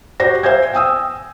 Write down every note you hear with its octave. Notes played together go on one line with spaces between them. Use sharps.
F#4 G4 C5 D5 A#6
C5 E5 F5 G#5 G6 G#6
G5 G#5 D#6 E6